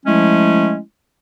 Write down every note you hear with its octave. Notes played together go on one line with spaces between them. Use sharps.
F3 G#3 A3 C#4 E4